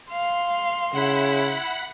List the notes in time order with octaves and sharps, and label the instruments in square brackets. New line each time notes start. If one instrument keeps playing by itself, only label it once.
[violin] F5 [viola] C6
[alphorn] C#3 [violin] E4 [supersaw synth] F#5 B5